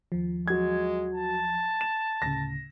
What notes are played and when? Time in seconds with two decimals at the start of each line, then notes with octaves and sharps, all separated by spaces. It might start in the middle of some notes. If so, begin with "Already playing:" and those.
0.12 D#2 F3
0.48 F#3 G#3 G#6
1.15 A5
1.81 E7
2.22 D2 A2 C#3 A#6